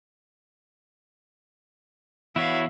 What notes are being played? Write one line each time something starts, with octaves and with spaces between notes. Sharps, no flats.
E2 E4 F#4 C#5 E5 F5